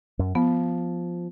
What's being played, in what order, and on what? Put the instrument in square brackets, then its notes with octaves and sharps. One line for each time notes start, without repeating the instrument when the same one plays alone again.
[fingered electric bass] F#2
[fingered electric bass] F3 [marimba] B3